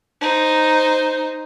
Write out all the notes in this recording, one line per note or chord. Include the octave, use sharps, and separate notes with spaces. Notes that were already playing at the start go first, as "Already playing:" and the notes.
D#4 C5